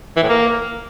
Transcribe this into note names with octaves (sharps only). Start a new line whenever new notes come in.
E3
A2
A#3